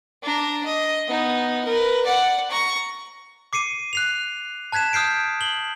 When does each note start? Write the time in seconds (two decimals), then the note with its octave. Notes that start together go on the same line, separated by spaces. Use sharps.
0.23 D4 A#5
0.65 D#5
1.08 B3 D#4
1.65 A#4 B4
2.05 D5 F#5
2.50 A#5 C#6
3.53 D6 C7 C#7 D#7
3.93 F#6 C7 F7
4.72 A5 F#6 G#6 B6 E7
4.93 D#6 F6 G6 C7 D7
5.41 F#7 G7